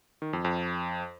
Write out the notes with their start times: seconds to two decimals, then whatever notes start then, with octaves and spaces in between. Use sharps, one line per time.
0.22 D#3
0.33 F2
0.45 F2